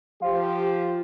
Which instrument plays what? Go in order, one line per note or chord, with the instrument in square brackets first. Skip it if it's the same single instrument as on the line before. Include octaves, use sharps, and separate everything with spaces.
[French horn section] F3 G4 [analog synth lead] F4